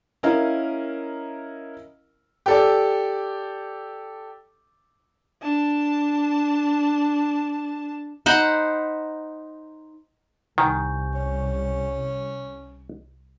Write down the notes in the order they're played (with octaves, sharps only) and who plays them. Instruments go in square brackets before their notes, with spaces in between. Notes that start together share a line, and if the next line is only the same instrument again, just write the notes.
[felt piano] C#4 E4 A#4 D#5 F5
[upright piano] G4 A4 D5
[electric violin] D4 A5
[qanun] D#4 C5 F#5 B5
[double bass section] C2 [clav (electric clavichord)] D#3 [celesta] G#5 C#6 G6
[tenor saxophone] C#4